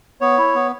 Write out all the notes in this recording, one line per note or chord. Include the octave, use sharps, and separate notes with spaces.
B3 C#5
E4
B3